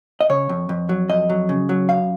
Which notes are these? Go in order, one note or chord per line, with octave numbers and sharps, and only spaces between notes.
D#5
C#3 C#5
F2
F2
F#3
F2 D#5
F#3
C#3
F#3
F#2 F5